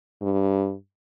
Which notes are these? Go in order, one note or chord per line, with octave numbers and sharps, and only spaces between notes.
G2